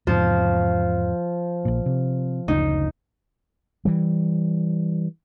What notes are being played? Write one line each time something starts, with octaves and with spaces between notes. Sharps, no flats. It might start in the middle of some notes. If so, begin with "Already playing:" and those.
E2 G#2 C3 F3
A#1 A#2
C3
F#1 D2 C#3 D#4
E3 G3